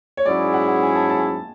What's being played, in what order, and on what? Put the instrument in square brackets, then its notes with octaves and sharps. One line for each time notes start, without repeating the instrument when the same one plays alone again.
[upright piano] C#5
[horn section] G#2 F#3 C#4 E4 G#4 [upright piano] D5
[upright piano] F#5
F#5
G#5
A5
A5